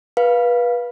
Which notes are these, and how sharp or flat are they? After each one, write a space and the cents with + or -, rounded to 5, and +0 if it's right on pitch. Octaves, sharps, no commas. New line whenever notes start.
B4 -25 F5 +0